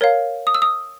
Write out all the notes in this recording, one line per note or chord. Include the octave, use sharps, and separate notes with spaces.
A#4 C#5 F5
D#6
E6
D#6